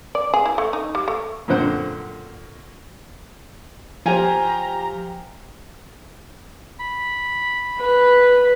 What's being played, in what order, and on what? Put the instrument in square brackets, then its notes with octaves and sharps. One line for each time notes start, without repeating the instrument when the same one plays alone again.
[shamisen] D5
G#4
E4
A3
D#4
G3
A3
[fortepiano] F#2 A#2 D3 C4 C5 F#5
[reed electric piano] F3 [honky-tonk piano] F4 G4 C5 [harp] G#5 [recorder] A#5
[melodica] B5
[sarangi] B4